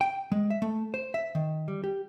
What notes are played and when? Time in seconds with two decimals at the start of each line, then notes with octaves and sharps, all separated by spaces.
0.01 G5
0.32 G#3
0.50 E5
0.62 A3
0.94 C5
1.14 E5
1.35 D#3
1.68 G3
1.84 G4